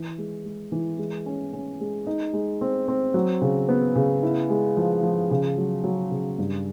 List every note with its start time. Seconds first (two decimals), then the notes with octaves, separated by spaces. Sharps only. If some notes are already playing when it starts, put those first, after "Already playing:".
Already playing: E3
0.18 G#3
0.45 G#3
0.72 E3
0.98 G#3
1.26 C#4
1.53 C#4
1.80 G#3
2.07 D#4
2.33 G#3
2.61 C4
2.88 C4
3.14 F#3
3.42 C#3
3.69 B3
3.95 C#3
4.23 E4
4.50 G#3
4.77 F3
5.03 F3
5.31 C#3
5.58 F#3
5.84 F#3
6.11 C#3
6.38 G2